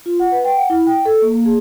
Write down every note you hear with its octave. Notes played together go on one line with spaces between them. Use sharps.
F4
F#5
B4
G5
F#5
E4
G5
A4
A#3
A#3
G#4